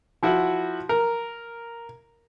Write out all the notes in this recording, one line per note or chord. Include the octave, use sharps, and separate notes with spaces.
F3 E4 F#4
A#4